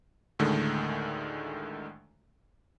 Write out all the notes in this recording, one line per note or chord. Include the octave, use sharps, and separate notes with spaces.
D2 A2 D3 D#3 G#3 A3